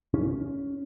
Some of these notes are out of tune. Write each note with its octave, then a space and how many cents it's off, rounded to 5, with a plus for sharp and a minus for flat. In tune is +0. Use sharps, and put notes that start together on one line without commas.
C#4 +10